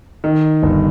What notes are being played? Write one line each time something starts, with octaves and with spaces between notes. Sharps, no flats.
D#3
G1